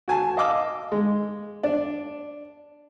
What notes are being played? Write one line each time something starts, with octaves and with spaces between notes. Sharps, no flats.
F#4 G#5 A5
D#5 F5 D6 E6
G#3
D4